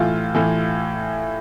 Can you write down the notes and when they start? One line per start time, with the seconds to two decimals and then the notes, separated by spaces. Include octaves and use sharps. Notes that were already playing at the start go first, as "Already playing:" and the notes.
Already playing: A2 E3 F4
0.35 A2 E3